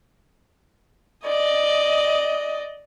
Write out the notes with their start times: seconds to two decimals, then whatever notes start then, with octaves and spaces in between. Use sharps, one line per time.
1.25 D5 D#5